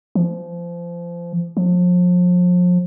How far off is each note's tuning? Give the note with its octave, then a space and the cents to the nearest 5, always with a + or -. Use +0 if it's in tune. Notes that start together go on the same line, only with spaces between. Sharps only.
F3 -25
F3 +35